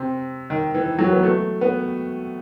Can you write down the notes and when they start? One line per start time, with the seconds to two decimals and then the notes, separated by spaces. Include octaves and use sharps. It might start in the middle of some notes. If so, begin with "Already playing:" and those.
Already playing: C3
0.50 D#3
0.74 E3
0.99 F#3
1.12 B3
1.23 A3
1.61 B3